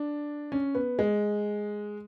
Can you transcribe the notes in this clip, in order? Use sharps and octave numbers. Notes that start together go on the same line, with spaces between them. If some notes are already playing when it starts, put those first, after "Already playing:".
Already playing: D4
C#4
B3
G#3